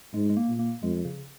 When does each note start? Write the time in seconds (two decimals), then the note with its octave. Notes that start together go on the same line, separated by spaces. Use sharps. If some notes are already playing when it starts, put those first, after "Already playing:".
0.14 G#2 G#3
0.30 G#3
0.37 A#3
0.48 A#2
0.59 A#3
0.83 F2 G#3
1.05 C#3